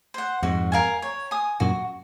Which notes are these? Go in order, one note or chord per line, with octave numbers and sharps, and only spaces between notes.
C5 F#5
F2 G#2 F#4
A#4 F5 G#5
C#5
G#5 D#6
F#2 A#2 F#4